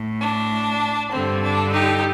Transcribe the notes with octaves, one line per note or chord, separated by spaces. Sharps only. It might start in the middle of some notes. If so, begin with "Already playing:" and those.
Already playing: A2
D4
G2 D3 C4
D4
D#4 G4